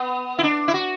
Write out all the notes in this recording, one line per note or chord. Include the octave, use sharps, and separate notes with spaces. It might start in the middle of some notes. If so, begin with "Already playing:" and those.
Already playing: B3
E4
D4
E4
F#4